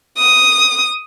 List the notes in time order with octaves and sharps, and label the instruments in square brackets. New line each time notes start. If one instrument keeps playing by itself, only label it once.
[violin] D#6